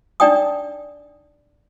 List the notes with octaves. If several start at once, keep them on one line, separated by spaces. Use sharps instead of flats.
D4 D#4 D5 G5 G#5 D#6